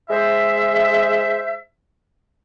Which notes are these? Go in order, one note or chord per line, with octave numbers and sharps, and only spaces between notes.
G#3 C5 E5